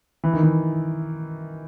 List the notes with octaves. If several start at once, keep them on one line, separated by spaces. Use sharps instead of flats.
E3
D#3
E3